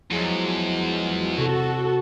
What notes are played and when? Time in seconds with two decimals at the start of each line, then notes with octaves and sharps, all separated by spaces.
0.11 E2 F3 F#3 G#3
1.38 C3 F#4 A4